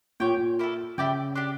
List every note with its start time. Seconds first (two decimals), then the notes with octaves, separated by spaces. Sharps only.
0.20 A#2 G4 C#5 G5
0.37 A#2
0.59 A#3 E4 A4
0.98 C#3 E4 G4 D5 G5
1.35 D4 G4 D5